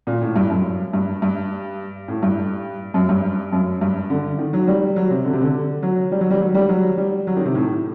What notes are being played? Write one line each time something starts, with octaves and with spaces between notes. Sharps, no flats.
A#2
A2
G2
F#2
G2
G2
A2
G2
F#2
G2
F#2
G2
D3
D#3
F#3
G3
F#3
C3
D3
C3
D3
F#3
G3
F#3
G3
F#3
G3
F#3
G3
F#3
D#3
C3
A2